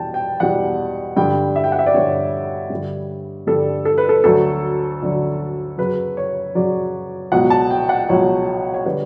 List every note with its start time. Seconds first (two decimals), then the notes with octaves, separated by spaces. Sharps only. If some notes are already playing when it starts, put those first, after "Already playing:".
Already playing: E2 B2 G3 G5 A5
0.14 G5
0.40 E2 B2 G3 F#5
1.17 G2 D3 G3 G5
1.56 E5
1.64 G5
1.72 F#5
1.79 E5
1.86 D5
1.94 G2 D3 G3 C#5
2.70 G2 D3 G3
3.47 G2 D3 G3 A4
3.85 A4
3.98 B4
4.09 A4
4.24 D2 D3 F#3 A4
5.02 D2 D3 F#3
5.78 F#2 C#3 F#3 B4
6.17 C#5
6.55 F#2 C#3 F#3 D5
7.32 C#2 B2 F#3 F#5
7.50 A5
7.70 G5
7.89 F#5
8.09 C#2 B2 F#3 C#5
8.74 C#5
8.85 D3 G3 B4